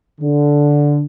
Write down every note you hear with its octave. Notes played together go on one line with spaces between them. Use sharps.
D3